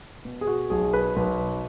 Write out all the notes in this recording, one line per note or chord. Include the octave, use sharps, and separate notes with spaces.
B2
G#4
F#4
B1 G#4
B4
B1 B4